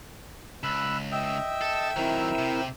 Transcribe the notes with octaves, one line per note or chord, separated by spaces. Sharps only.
C#2 B5 E6 F#6
D#5 E5 G5 E6
A4
D#3 F#3 C4 E4 A#4
C3